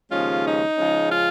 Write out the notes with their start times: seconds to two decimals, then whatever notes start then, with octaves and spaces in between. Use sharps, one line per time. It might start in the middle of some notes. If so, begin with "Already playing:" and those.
0.10 D#2 C#3 F3 G#3 C#4 F4
0.44 D#4
0.77 C#3 F3 G#3 C#4
1.10 F4